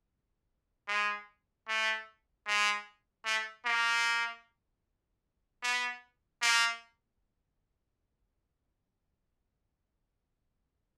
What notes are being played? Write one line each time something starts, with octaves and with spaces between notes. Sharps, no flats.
G#3
A3
G#3
A3
A#3
B3
A#3